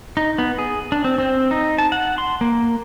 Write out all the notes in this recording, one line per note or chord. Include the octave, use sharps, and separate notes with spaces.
D#4
B3
G#4
D4
C4
C4
D#4
A5
F#5
C6
A#3